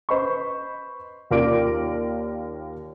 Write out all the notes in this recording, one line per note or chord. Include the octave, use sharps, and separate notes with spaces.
B4 C5 D#5 B5 C#6
D#2 F4 A#4 D5 D6 D7